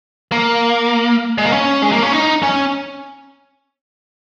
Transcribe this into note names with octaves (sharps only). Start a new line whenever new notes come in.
A#3
G#3
A#3
C#4
G#3
A#3
C#4
D#4
C#4